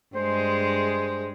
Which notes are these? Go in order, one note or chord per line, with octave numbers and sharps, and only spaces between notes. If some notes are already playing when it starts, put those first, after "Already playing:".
G2 G#3 G#4 C5